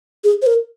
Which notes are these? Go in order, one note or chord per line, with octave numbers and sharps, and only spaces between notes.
G#4
C5
A#4